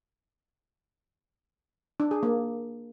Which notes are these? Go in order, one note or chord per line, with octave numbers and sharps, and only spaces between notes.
D4
G#4
A#3